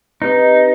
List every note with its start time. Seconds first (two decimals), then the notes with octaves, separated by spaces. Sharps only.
0.21 C4 D#4 G4 B4 D#5